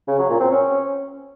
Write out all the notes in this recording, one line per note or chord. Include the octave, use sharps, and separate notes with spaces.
C#3
F#3
A#2
C4
C#4